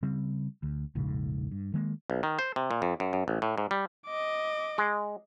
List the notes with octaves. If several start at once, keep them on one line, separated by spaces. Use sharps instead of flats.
C#3 G3 C4
D2
E1 A#1 G#2 C#3
G2
D#3 G#3 A#3
B1
D#3
C5
C3
A#2
F2
F#2
F#2
A1
A2
G#2
G3
D#5 D6
G#3